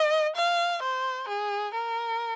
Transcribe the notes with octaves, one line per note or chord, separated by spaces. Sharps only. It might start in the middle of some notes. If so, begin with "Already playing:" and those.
Already playing: D#5
F5
C5
G#4
A#4